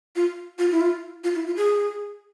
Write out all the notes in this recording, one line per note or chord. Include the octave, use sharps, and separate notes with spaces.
F4
F4
E4
F4
F4
E4
F4
G#4